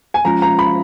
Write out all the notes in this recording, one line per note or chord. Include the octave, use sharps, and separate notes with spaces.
G#5
F3 G#3 C#4 F4 A#5
A#5
B5